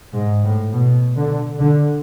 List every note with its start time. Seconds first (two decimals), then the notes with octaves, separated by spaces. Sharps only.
0.13 G#2
0.44 A2
0.72 B2
1.16 D3
1.60 D3